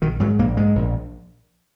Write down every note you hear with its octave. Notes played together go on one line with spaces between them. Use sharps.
A#1 D#3
G#2 F#3
A#1 A#3
G#2 G#3
A#1